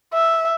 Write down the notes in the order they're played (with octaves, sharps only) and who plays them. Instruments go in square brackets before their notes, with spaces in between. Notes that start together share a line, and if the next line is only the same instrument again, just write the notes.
[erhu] E5